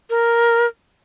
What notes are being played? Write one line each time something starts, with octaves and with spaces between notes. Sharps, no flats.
A#4